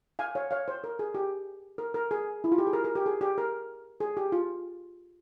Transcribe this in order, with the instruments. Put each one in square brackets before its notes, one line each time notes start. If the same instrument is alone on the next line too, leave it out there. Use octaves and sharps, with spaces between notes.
[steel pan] F5 G#5
C#5 F5
C#5 F5
C5
A#4
G#4
G4
A#4
A#4
G#4
E4
F4
G4
G#4
A#4
A#4
G4
G#4
G4
A#4
G#4
G4
F4